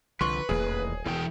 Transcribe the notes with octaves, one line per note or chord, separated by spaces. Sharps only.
C2 D3 F3 B4 C6 C#6
D#1 A1 E2 A#3 G#4
E1 E2 E3 A3 G5